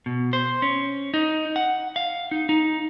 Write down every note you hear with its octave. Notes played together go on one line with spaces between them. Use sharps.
B2
C5
C#4
D#4
F#5
F5
D#4
D#4